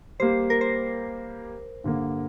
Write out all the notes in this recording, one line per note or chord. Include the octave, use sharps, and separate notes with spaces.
G3 A#3 G4 C5
A#4
C5
G2 D3 A#3